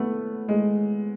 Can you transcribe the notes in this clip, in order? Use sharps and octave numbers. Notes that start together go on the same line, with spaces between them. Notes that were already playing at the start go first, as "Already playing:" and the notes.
Already playing: A3 B3
G#3